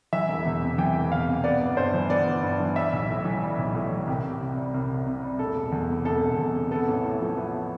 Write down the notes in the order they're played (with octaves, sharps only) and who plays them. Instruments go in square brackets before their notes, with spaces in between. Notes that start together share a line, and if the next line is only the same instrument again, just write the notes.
[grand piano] E3 E5
E1
E2
C3
E3 G5
E1
E2 F5
C3
B3 D5
G1
G2 C5
E3
B3 D5
G1
G2
E3
G3 E5
B1
A2
E3
G3
B1
A2
E3
C2 G4
C2
C3
G3
C2
C2
C3
G3
E1 A4
E1
E2
C3
E1 A4
E1
E2
C3
B3 A4
A1
A2
F3
B3